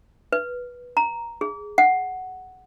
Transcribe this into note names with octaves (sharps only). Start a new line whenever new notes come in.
B4
A#5
G#4
F#5